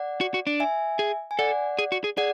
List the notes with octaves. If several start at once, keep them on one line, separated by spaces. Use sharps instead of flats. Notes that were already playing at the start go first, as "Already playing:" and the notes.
Already playing: D5 F#5
F#4
F#4
D4
E5 G#5
G#4
G#5
A4 D5 F#5
G#4
F#4
G#4
G#4 D5 F#5